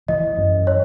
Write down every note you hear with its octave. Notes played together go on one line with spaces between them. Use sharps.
E3 D#5
F#2
C#5